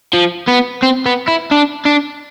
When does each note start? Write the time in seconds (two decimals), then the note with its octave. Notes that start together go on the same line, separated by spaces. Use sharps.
0.14 F3
0.48 B3
0.83 C4
1.06 B3
1.28 E4
1.52 D4
1.86 D4